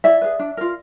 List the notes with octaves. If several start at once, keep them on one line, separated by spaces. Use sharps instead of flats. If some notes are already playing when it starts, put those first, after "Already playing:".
E4 D5 E5
G#4 B4
D4
F4 A#4